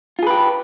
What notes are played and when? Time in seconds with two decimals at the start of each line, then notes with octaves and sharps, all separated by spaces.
0.19 F4
0.23 G#4
0.26 B4
0.30 G4